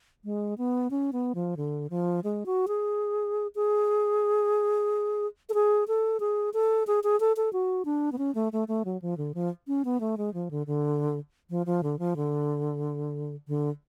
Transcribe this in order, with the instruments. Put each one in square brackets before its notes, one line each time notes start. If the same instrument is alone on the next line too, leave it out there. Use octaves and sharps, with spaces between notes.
[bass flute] G#3
B3
C#4
B3
F3
D3
F3
G#3
F#4
G#4
G#4
A4
G#4
A4
G#4
A4
G#4
G#4
A4
A4
F#4
D4
B3
C#4
A3
A3
A3
F#3
F3
D3
F3
C#4
B3
A3
G#3
F3
D3
D3
F3
F3
D3
F3
D3
D3